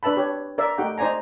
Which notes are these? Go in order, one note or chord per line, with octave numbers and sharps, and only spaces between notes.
D4 B4 E5 A5 B5
G4 C#5
A#4 D5 E5
A3 D#4 G4 F#5 G5
D#4 C5 D5 G#5 A#5